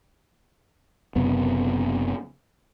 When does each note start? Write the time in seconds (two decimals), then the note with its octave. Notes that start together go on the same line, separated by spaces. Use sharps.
1.16 F#1 F#2 C3 B3